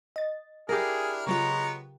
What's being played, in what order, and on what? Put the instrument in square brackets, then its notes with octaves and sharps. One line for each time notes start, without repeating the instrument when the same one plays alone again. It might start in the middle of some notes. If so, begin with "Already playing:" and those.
[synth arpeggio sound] D#5 A6
[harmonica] D4 E4 F6 [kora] G4 A#4 [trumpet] G#4
[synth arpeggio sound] C#3 F#3 F4 [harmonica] G#3 B3 C#5 [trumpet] A#5